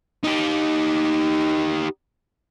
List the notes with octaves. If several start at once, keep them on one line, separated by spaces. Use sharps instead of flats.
D#4 G4